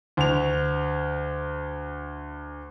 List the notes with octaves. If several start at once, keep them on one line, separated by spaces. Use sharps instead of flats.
D2 F7